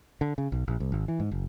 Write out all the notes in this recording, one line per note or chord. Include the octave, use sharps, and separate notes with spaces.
D3
C#3
B1
A#1
C2
G#1
E3
G#2
F#1